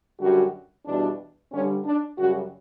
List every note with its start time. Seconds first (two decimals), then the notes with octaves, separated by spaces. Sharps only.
0.19 F#2 D3 G3 F#4
0.85 E2 B2 G3 D4
1.52 G2 D3 G3 C#4
1.85 D4
2.18 F#2 C#3 G3 F#4